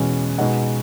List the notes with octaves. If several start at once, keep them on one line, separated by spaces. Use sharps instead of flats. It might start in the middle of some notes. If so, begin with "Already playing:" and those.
Already playing: E2 B2 G#3 C#4
B2 G#3 D#4 F#5